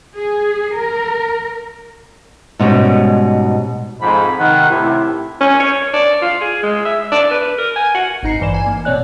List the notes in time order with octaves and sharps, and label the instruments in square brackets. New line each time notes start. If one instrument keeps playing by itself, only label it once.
[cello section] G#4
A#4
[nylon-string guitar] G#2 B2 G3 C#4
[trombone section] F2 G#2 [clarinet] B5
[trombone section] C3 D#3 [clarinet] F#5
[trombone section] A2 C3 [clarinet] E4
[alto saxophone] C#4
C#5
D5
F4
G#4
G#3
E5
D5
B4
A#4
G#5
F#5
[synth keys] G#1 G#2 D#4 A#5 C7 C#7
G2 E3 C5 D5 E7
G#5
A#3
B2 C4 C#5 D5 F#6